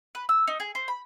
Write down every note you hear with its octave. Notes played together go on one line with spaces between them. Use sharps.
B4
E6
D#4
G#4
C5
B5